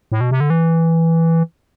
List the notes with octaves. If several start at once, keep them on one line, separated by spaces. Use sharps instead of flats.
A2
B2
C3
D3
E3